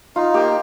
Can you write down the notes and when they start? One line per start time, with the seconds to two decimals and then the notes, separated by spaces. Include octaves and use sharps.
0.16 D#4 F4
0.34 A#3 G4